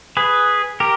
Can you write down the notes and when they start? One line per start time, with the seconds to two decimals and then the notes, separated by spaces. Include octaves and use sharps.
0.17 G#4 B4
0.80 G4 A#4